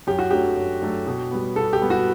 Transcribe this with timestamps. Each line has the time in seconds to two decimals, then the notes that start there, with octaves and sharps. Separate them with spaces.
0.07 F#2 G4
0.19 F#4
0.31 F#3 A3 D4 G4
0.57 F#2
0.82 F#3 A3 D4
1.07 B2
1.31 G3 B3
1.56 B2 A4
1.73 G4
1.82 G3 B3
1.90 F#4